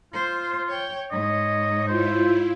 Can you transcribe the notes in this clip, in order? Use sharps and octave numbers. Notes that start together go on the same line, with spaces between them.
F4 C5
C#5 G5
G#2 C#5 D#5
E4 F4 C5